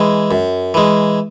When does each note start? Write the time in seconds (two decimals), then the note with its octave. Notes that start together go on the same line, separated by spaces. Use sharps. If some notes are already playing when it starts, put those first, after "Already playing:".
Already playing: E3 G#3
0.31 F#2
0.74 E3 G#3